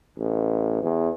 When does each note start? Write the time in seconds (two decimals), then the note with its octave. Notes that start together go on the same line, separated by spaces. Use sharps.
0.18 A1
0.83 E2